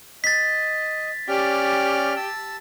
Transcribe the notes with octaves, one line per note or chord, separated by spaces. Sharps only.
D#5 A6 B6
C#4 G4 D5 F6
A5 E6